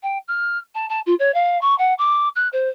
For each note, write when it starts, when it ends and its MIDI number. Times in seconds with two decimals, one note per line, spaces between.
0.03 0.18 79
0.28 0.58 89
0.75 0.86 81
0.90 1.00 81
1.06 1.15 65
1.19 1.34 73
1.34 1.60 77
1.61 1.77 85
1.78 1.94 78
1.99 2.29 86
2.36 2.48 90
2.53 2.69 72